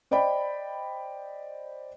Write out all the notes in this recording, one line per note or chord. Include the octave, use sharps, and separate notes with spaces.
C5 D5 D#5 G5 B5